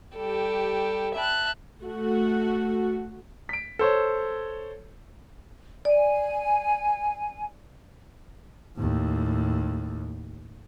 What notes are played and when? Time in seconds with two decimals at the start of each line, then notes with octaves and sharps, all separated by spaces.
0.15 G3 G4 A4
1.14 E5 A5 F#6
1.83 A3 F#4
3.49 B6 D7
3.79 A4 C5 C#5
5.85 D5 G#5
8.76 D#2 A2